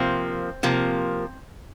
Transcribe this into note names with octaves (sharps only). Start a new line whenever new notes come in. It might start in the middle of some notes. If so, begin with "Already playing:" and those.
Already playing: C3 F3 A#3 C4
C3 F3 A#3